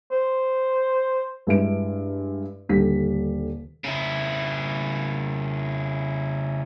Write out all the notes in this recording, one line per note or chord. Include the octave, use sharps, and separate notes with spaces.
C5
G2 G#3 E4 B4 D7
D#1 D3 G3 B6
C#3 E4